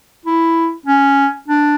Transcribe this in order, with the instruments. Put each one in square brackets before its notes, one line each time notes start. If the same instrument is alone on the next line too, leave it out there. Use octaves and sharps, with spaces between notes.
[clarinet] E4
C#4
D4